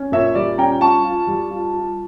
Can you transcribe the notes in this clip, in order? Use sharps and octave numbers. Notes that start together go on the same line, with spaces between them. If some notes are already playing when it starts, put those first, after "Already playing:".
Already playing: C#4
A#2 C#5 E5
G3 D5
C#4 G5 A#5
F4 A5 C#6
F4
G3
F4
F4